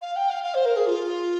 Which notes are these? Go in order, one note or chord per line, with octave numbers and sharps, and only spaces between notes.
F5
G5
F5
F5
C5
A#4
G#4
F4